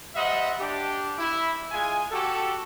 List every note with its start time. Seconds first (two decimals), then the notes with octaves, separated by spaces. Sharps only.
0.15 G3 C5 D#5 E5 F#5
0.59 D4 G4
1.19 E4
1.71 G#3 F4 G#5
2.11 F#4 G4 A4